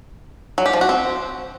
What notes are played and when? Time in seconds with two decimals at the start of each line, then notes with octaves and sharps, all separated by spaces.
0.58 F#3
0.66 G4
0.73 F3
0.81 F#4
0.89 C4